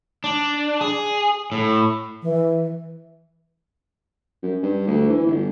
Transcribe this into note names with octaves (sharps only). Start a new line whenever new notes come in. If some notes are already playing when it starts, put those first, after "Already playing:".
D4
G#4
A2
E3
F#2
G2
D2
E3
G1